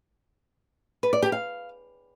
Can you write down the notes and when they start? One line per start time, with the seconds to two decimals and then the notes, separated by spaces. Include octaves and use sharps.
1.03 B4
1.13 D5
1.22 G4
1.32 F5